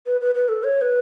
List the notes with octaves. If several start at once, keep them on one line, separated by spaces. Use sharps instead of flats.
B4
B4
B4
A4
C#5
B4